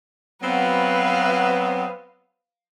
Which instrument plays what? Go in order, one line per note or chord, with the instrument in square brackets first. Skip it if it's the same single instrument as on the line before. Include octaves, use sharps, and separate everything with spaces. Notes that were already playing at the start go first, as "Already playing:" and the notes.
[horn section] F#3 B3 C4 [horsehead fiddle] B4 F5